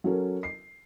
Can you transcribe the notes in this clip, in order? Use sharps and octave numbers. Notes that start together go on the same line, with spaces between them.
F#3 C#4 A4 A#4
C7